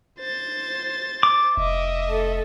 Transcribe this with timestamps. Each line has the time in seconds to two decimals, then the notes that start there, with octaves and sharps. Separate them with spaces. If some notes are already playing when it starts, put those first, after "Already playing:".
0.19 C5 A6
1.23 D6
1.57 F1 D#5 E5
2.07 A3 A4